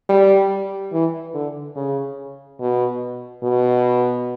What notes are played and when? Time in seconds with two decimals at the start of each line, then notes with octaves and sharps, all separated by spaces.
0.09 G3
0.92 E3
1.34 D3
1.76 C#3
2.60 B2
3.43 B2